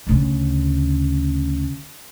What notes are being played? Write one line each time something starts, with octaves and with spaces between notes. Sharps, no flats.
D2 C#3